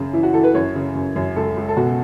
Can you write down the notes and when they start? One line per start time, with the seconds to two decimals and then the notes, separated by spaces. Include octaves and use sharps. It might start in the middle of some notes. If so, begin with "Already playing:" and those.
Already playing: F#2 C#3
0.13 E3 E4
0.23 F#4
0.34 E3 A4
0.44 B4
0.54 F#2 C#5
0.75 C#3
0.95 F#2
1.16 F#2
1.36 C#2 A4
1.57 C#2
1.69 A4
1.77 B2 F#4